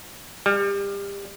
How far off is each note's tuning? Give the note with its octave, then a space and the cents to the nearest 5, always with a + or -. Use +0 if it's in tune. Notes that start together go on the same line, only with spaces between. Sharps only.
G3 +30